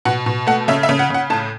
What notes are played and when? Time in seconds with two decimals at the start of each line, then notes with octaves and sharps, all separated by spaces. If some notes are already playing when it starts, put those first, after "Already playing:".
0.05 B2 F#5
0.26 B2
0.47 A3 F#5
0.68 C#3 E5
0.83 E5
0.89 C#3
0.99 F#5
1.10 C#3 F#5
1.30 A2 A5